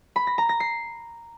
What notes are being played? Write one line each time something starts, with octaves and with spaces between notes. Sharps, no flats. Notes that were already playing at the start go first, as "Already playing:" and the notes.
B5
A#6
A#5
A#6
C7